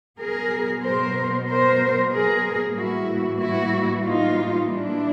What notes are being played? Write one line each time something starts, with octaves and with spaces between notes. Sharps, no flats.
B2 F#3 B3 G#4 A#4
A#4 C5
A#4 C5
G#4 A#4
A2 E3 G3 A#3 E4 F#4
E4 F#4
D#4 F4
D4 E4